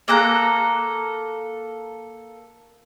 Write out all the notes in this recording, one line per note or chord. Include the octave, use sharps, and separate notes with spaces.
A#3 A4 A#5 F#6